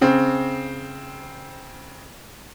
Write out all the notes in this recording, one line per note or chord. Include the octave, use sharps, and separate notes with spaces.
C#3 C4